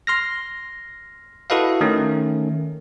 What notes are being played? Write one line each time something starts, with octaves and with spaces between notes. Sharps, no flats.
C6 F6 A#6
E4 F#4 A4 B4 D#5 F5
D#3 A3 C#4